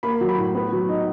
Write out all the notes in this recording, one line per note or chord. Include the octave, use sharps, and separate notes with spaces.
A#3 B5
F#3
B5
A2
B3
F#3
D#4